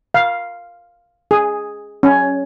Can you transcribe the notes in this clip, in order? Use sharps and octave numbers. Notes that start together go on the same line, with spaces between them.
F5
G#4
C#4